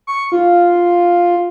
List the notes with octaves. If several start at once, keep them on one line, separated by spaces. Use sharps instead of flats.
C#6
F4